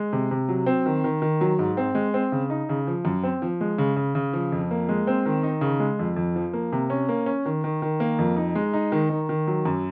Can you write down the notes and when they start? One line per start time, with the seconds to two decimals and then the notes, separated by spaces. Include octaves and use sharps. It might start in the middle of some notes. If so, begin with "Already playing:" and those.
Already playing: G#3
0.13 C3
0.31 C3
0.48 F#3
0.66 C4
0.86 D#3
1.04 D#3
1.22 D#3
1.41 F#3
1.59 G#2
1.77 C4
1.95 G#3
2.14 C4
2.32 C#3
2.50 D#4
2.69 C#3
2.87 F3
3.05 F#2
3.23 C4
3.42 F3
3.61 G#3
3.78 C#3
3.96 C#3
4.15 C#3
4.33 F3
4.52 F2
4.71 A#3
4.89 G#3
5.07 C4
5.26 D#3
5.43 D#4
5.61 C#3
5.80 G#3
5.99 F2
6.16 F2
6.36 F3
6.53 A#3
6.72 C3
6.90 C#4
7.09 A#3
7.26 C#4
7.45 D#3
7.64 D#3
7.82 D#3
8.00 A#3
8.19 F2
8.36 D#4
8.55 G#3
8.73 D#4
8.92 D#3
9.10 D#3
9.29 D#3
9.47 F#3
9.65 F#2